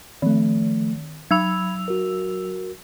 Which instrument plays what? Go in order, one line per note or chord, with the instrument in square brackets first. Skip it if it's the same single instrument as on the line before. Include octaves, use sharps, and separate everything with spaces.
[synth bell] D#3 [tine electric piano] F3 A3
[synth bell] F#3 E6 F7 [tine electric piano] B5 G#6
[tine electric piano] F#4 A#4